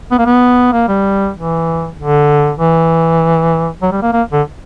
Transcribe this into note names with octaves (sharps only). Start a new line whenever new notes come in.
B3
A#3
B3
A#3
G3
E3
D3
E3
F#3
G3
A#3
A#3
D3